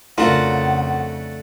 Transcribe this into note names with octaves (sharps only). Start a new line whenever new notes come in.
F2 C#3 A3 D4 F4 F#4 A#4 F#5